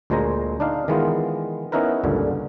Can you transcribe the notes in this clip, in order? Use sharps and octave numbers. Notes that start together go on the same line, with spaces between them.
D2 A#2 G#3 C5 A#5
D4 D#4 F5
D#3 E3 G#3 B3 F4
B3 C#4 D#4 E4 A#4 B4
C#2 G2 A#2 D3